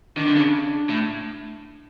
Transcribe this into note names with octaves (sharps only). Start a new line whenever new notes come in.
D#3 D4
D3
C#3
A2